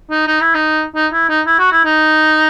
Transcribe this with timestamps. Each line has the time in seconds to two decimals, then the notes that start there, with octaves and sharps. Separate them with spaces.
0.11 D#4
0.27 D#4
0.41 E4
0.55 D#4
0.95 D#4
1.13 E4
1.29 D#4
1.46 E4
1.59 F#4
1.72 E4
1.85 D#4